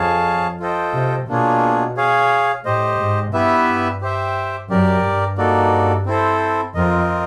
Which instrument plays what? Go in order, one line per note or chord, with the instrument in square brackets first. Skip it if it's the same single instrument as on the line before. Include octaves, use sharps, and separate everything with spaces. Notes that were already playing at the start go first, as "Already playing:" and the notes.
Already playing: [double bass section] F2 [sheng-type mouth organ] G#4 C#5 F5 A5
[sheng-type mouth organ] F4 A4 C5 D#5 G5
[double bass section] C3
[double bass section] B2 [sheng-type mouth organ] A#3 D4 F4 G#4 C#5
[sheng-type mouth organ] G#4 C#5 F5
[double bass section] A2 [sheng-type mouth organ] G4 C5 D#5
[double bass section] G#2
[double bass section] G2 [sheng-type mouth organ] B3 E4 G4 B4 E5
[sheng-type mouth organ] G4 C5 E5 G5
[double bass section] F#2 [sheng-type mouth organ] G4 A#4 D5
[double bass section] G2
[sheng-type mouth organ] A#3 D#4 F#4 A4 D5
C4 E4 A4 C5
[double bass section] F2 [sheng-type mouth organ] C4 F4 A#4 D#5